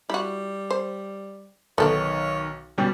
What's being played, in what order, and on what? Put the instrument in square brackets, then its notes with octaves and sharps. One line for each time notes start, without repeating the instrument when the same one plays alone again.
[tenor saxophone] G3 [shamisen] E4 F#4
[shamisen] C5
[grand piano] B1 D#3 [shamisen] B3 A4 F#5 [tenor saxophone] C#5
[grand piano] B2 G3 C#4